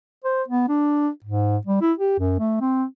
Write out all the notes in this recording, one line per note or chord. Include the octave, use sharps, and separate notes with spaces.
C5
B3
D4
G#2
G3
E4
G4
F#2
A3
C4